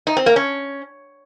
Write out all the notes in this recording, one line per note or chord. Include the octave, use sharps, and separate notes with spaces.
D#4
C4
A#3
C#4